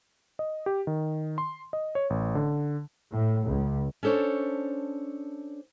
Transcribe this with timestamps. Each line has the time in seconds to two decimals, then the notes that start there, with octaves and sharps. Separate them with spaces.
0.39 D#5
0.66 G4
0.87 D#3
1.38 C6
1.73 D#5
1.95 C#5
2.10 A1
2.35 D3
3.11 A2
3.45 C#2
4.03 C#4 D4 A4 C5 C#5